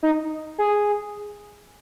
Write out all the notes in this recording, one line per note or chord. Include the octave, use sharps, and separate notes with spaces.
D#4
G#4